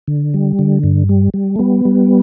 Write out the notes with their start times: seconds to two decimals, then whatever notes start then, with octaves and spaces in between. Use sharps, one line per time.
0.08 D3
0.34 G3
0.59 D3
0.84 G2
1.09 G3
1.34 G3
1.56 A3
1.59 G3 B3
1.85 G3